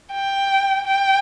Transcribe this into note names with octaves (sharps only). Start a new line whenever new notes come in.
G5
G5